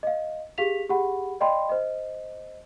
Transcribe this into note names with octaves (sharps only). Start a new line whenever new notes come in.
D#5 F5
G4 G#4 F5 B6 F7
G4 G#4 F#5 B5
D5 D#5 F5 G5 B5 C6
C5 D#5